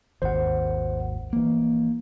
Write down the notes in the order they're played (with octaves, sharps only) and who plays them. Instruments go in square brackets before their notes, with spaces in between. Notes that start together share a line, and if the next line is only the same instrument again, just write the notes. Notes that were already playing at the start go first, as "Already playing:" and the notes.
[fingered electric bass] G#1 D#2 [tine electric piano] C5 F#5
[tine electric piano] A#1 E3 [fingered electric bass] A#3